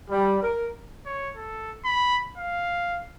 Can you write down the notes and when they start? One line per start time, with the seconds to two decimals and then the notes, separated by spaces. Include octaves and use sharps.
0.10 G3
0.42 A#4
1.05 C#5
1.36 A4
1.85 B5
2.38 F5